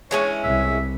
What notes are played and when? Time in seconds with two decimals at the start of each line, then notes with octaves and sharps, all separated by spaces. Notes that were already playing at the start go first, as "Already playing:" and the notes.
0.11 E3 G#3 C#4 C#5
0.44 C2 E5